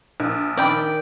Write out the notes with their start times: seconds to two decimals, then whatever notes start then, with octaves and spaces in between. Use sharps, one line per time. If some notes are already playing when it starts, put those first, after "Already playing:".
0.20 A#1
0.57 D#3 D5 G5 B5